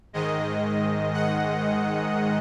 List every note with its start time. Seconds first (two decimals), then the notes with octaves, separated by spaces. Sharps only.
0.13 G#2 D#3 G#3 D#5
1.13 F#5